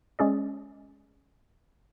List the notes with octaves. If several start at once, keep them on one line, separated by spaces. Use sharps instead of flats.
G#3 C#4 G#4 D5